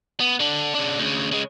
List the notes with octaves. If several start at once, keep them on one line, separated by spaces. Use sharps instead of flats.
B3
D3 D4
C#3 D4
D2 C#3
C#3 G#3